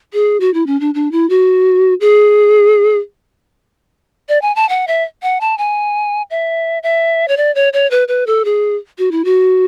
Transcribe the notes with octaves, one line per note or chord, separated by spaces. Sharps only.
G#4
F#4
E4
C#4
D4
D4
E4
F#4
G#4
D5
G#5
A5
F#5
E5
F#5
A5
G#5
E5
E5
C#5
D5
C#5
C#5
B4
B4
A4
G#4
F#4
E4
F#4